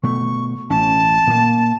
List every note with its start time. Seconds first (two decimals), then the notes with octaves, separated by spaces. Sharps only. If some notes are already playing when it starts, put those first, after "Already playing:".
0.03 B2 A3 C#6
0.70 A1 C#4 A5
1.27 A#2 A#3